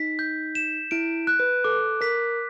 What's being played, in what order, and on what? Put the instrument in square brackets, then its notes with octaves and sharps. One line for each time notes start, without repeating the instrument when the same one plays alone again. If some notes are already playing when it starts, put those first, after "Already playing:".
Already playing: [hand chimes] D#4 [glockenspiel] B6
[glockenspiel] G6
E7
[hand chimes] E4 [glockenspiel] D7
[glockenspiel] F#6
[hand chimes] B4
[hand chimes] A4 [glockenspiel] D6
[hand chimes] A#4 [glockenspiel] B6